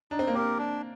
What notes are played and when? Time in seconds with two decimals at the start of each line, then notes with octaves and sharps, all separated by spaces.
0.11 D4 D#4
0.19 C4
0.27 A#3
0.35 C4 G4 A#4
0.58 D4